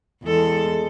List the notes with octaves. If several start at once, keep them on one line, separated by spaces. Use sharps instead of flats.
E2 G#3 A4